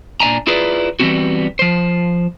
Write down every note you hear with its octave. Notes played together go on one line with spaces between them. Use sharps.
A#2 D4 E5 G#5 A#5
E4 F4 G#4 A#4 B4 D5
E3 G3 G#3 B3 C4 F#4
F3 C5